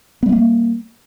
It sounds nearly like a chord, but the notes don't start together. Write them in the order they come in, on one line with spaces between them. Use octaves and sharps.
B3 G3 G#3 A#3